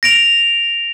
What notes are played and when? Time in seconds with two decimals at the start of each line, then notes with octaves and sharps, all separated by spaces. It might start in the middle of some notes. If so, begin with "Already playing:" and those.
0.03 A#6 D7 F7